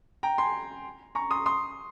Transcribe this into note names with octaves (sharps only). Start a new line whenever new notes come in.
G5 A#5
G#5 C6
A#5 C#6
C6 D#6
C6 D#6